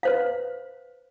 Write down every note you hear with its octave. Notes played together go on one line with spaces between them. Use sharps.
B4 C5 F5